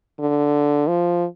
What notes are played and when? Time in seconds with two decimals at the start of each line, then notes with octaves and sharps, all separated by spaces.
0.19 D3
0.88 F3